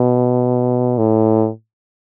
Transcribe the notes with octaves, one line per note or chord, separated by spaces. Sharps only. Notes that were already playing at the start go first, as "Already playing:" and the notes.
Already playing: B2
A2